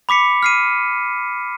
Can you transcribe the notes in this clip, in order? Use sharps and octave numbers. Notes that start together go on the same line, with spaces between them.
B5 D6 B6 C#7
F6 C7 D#7